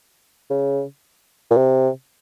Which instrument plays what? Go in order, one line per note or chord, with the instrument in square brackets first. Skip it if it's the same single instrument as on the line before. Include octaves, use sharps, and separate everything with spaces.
[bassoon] C#3
A#2
C3